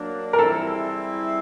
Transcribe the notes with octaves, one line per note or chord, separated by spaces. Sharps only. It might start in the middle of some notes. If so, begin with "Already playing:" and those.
Already playing: F#3 A#3 D4
A#4
G3 C4 E4 G#4 A4